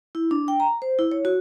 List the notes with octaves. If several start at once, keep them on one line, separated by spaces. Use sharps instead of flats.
E4
D4
G5
A#5
C5
E4
C#5
F#4